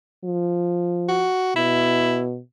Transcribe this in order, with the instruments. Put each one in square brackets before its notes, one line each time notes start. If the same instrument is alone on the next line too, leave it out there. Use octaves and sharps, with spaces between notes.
[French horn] F3
[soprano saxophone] F#4
[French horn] B2 [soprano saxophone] E4